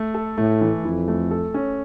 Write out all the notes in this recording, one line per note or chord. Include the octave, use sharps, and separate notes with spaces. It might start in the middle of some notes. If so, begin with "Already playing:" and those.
Already playing: A3
A4
A2 A3
E3
F2 E4
A3
A4
C#4